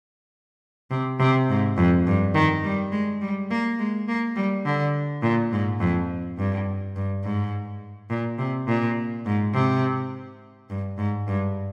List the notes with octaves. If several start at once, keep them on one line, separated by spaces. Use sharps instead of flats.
C3
C3
G#2
F2
G2
D#3
G3
G#3
G3
A#3
G#3
A#3
G3
D3
A#2
G#2
F2
G2
G2
G#2
A#2
C3
A#2
G#2
C3
G2
G#2
G2